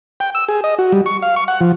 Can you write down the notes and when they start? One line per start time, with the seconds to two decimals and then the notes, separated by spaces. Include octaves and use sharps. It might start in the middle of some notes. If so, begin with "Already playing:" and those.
0.20 G5
0.35 E6
0.48 G#4
0.64 D#5
0.79 F#4
0.92 G3
1.06 C#6
1.22 F5
1.36 C#6
1.48 F#5
1.61 F3